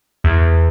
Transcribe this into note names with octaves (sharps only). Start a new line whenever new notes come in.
E2